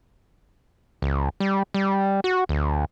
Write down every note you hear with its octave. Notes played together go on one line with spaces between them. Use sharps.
C#2
G3
G3
F#4
D2